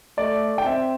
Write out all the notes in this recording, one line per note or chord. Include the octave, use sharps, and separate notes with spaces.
A3 D5
G5
C4 E5